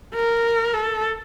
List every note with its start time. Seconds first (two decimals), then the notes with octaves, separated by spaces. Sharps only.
0.15 A#4
0.74 A4